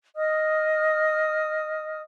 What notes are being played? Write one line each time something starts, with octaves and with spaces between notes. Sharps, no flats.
D#5 D#6 F6